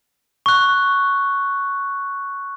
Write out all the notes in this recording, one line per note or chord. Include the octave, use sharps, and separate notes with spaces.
C#6 F#6